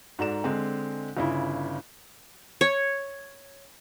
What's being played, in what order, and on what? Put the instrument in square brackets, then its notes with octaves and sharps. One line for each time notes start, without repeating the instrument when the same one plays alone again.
[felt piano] G#2 F#4 A4 D5 A#5 E7
D3 G#3 C4
G1 C#3 E4 F4
[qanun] C#5